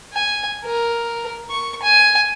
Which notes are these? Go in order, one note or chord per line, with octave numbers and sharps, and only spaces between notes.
G#5
A#4
C#6
G#5